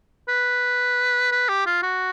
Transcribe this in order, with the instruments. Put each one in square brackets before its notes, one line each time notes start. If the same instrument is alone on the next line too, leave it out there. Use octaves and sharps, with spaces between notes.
[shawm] B4
B4
G4
F4
F#4